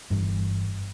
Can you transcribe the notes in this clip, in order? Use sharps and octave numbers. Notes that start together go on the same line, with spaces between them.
G1 G2 E3 G3